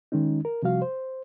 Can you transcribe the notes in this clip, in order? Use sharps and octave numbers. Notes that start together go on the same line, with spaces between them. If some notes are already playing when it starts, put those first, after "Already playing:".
D#3 G#3 C#4 D#4
A#4
C3 F3 G3 F#4 F5
C5